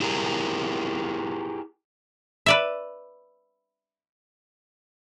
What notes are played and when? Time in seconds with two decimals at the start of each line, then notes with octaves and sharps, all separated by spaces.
0.01 E4 G4 G#4 A#4
2.46 B4 D5 E5